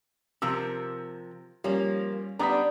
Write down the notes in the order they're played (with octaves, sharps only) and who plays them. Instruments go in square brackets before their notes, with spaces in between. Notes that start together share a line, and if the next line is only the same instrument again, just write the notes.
[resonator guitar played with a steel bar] C3 F3 A#4 [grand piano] E6
[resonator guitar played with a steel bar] F3 A#3 [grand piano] G3 C#4
[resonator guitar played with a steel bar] G3 B3 D4 [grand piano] A#5 D#6 B6